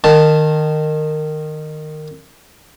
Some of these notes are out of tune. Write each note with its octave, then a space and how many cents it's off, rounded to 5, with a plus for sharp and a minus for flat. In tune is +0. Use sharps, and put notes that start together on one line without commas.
D#3 -20 A5 +0